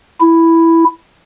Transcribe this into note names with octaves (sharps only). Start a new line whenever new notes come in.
E4